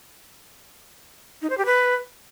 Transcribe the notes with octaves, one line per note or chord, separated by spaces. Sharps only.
D#4
C5
G4
B4